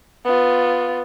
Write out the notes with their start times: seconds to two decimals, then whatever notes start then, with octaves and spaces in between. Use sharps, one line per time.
0.25 B3 F4